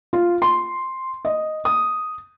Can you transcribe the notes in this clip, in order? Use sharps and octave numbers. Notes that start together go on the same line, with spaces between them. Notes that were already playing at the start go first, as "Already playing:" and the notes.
F4
C6
D#5
D#6